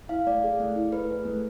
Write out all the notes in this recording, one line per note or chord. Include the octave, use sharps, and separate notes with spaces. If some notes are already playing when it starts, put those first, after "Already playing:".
E4 F5
A3 D5
G#4
A3
E4
A3 B4
G#4
A3